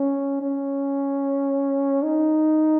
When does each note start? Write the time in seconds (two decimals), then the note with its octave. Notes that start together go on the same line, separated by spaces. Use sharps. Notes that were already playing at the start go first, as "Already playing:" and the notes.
Already playing: C#4
0.42 C#4
2.03 D#4